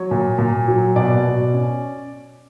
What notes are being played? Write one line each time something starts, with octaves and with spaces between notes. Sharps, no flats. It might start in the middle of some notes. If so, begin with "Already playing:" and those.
Already playing: F#3 C#5
A#2
A#2
F#3
B2 D5
B2
C#4